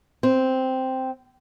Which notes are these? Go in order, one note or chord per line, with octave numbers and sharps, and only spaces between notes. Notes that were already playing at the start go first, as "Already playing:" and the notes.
C4